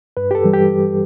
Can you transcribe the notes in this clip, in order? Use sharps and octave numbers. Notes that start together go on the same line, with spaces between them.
G2 B4
G4
A4
E3 G3
G4